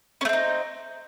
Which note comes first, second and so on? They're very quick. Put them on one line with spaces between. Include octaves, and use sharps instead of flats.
C#4 A3 C4 D#4